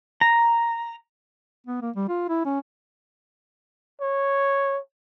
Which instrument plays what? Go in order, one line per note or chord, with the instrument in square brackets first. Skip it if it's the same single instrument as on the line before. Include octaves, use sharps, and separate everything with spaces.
[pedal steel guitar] A#5
[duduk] B3
A#3
G3
F4
E4
C#4
[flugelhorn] C#5